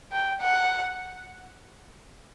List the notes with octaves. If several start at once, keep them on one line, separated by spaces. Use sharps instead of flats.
G5
F#5